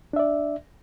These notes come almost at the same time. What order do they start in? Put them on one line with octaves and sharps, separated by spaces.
D4 E5 D5